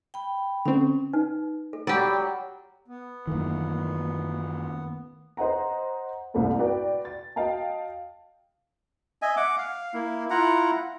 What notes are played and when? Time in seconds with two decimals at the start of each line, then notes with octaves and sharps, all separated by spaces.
0.14 G5 B5
0.66 D3 C4 C#4
1.13 D#4 B4
1.73 A4
1.87 F#3 G3 G4 D5
2.88 B3
3.27 F#2 D#3 E3 A3 A#3
5.37 C5 D#5 F#5 A#5
6.34 C2 A2 A#3 C4 A4
6.59 F#4 B4 D5 G5
7.05 A6
7.36 F#4 D#5 F5 G5 A5
9.22 D#5 E5 G#5
9.37 F#5 D6
9.58 F5
9.94 A#3 E4
10.30 E4 F4 F#5 A#5